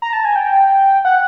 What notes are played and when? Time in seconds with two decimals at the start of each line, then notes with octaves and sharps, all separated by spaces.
0.02 A#5
0.13 A5
0.25 G#5
0.36 G5
1.05 F#5